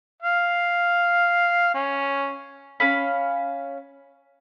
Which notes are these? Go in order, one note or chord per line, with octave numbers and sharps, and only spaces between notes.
F5
C#4
C#4 F5 B5